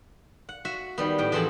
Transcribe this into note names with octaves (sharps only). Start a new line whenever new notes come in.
F#5
F#4 E5
D#3 G3 B3
A2 G5
F2 E3 C4 G#4 F#5 A5